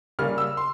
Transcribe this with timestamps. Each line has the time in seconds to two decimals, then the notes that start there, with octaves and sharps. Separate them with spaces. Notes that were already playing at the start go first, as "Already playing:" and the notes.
0.19 C#3 G3 A#3 C#4 F6
0.38 E6
0.57 C6